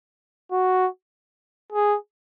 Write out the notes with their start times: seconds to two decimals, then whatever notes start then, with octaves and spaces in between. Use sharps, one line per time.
0.52 F#4
1.72 G#4